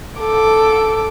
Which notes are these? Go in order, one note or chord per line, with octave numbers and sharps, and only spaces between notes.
A4 D6